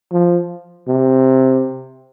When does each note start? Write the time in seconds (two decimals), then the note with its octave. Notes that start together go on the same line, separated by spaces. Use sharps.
0.12 F3
0.88 C3